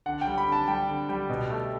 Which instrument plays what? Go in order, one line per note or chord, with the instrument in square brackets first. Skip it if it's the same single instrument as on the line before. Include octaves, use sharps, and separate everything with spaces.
[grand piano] D3 F#5
G5
G3
B5
D3 A5
G3 G5
D3
G3
B2
A3